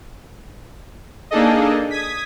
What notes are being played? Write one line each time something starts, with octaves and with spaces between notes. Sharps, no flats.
A#3 D4 D#4 G#4 A4 D#5
D#6 G#6 B6